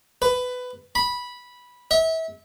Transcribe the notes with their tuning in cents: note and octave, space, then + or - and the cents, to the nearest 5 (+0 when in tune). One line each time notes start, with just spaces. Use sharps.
B4 +15
B5 -10
E5 -30